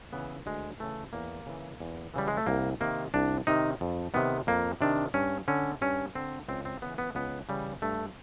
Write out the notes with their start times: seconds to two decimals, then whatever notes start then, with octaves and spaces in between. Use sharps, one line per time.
0.13 C#3 E3 B3
0.46 D2 G#3
0.79 C#3 E3 A3
1.13 E2 A#3
1.46 C#3 E3
1.80 E2
2.14 C#3 E3 G3
2.28 G#3
2.37 A3
2.46 C2 A#3
2.81 C3 D#3 A#3
3.14 C2 D4
3.47 C3 D#3 D#4
3.81 F2
4.14 C3 D#3 B3
4.47 F2 A#3
4.81 C3 D#3 D4
5.14 G2 C#4
5.48 D3 C#4
5.82 G2 C#4
6.15 D3 C4
6.48 C#2 C4
6.65 C4
6.82 C#3 E3 B3
6.98 B3
7.15 C#2 B3
7.49 C#3 E3 G3
7.82 G2 A3